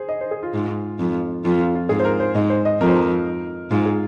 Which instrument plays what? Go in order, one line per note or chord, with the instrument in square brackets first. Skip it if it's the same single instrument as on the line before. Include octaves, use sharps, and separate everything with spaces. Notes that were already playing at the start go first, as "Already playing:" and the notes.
Already playing: [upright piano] G#4 C5
D#5
C5
G#4
F4
[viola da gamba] G#2 [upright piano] F4
[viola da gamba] F2
[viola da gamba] F2 [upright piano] F4
[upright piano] F4
F4
[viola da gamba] G#2 [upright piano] G#4
[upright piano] C5
A#4
C5
[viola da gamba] G#2 [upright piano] D#5
[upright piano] C5
D#5
[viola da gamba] F2 [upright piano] A#4
[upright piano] C5
A#4
[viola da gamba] G#2 [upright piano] F4
[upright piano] G#4